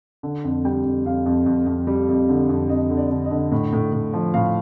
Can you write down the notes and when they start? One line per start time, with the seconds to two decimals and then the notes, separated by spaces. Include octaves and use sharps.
0.23 D3
0.44 F2
0.65 G3 G5
0.85 F2
1.05 F2 F5
1.26 F2
1.46 F2
1.67 F2
1.87 G3
2.09 F2
2.29 D3
2.49 F2
2.69 F2 D#5
2.90 D3
2.97 D5
3.11 D3
3.25 D#5
3.31 D3
3.51 A2
3.73 A2
3.92 A2
4.13 F3
4.34 A2 F5